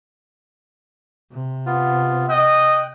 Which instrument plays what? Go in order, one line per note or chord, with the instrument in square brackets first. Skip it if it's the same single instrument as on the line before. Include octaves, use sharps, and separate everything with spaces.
[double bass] C3
[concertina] B3 F4
[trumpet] D#5 [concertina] G5 F#6